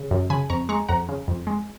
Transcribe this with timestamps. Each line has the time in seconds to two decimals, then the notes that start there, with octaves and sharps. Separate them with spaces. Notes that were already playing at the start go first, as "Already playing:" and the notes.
Already playing: C#3
0.11 F#2
0.30 C#3 G#5 B5
0.50 F2 A#5 C#6
0.69 G#3 A#5 C#6
0.88 F2 F#5 A#5
1.09 C#3
1.28 F2
1.47 G#3